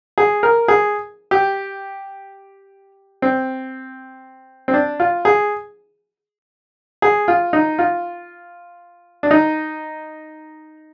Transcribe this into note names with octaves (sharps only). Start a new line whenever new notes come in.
G#4
A#4
G#4
G4
C4
C4
D4
F4
G#4
G#4
F4
D#4
F4
D4
D#4